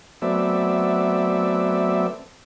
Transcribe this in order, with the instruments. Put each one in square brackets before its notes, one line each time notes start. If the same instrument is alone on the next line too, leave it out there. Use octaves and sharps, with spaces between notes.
[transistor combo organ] F#3 A3 B3 C4 D5 E5